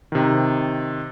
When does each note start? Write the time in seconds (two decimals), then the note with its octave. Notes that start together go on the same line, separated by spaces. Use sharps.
0.12 C3 D#3